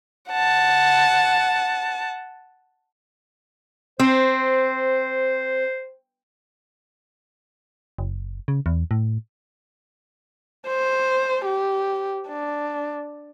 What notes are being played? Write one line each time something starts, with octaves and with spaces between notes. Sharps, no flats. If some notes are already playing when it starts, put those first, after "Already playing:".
F#5 A5
C4 C5
F#1
C#3
E2
A2
C5
G4
D4